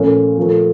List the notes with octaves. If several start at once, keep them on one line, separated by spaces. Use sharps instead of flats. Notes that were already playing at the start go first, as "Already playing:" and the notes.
Already playing: A#2 F3 A3 C#4
A#2 F3 A3